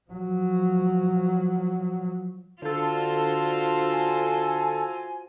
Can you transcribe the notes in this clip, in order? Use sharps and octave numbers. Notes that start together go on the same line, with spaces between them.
F3 F#3
D3 F4 F#4 A4 C5
G#5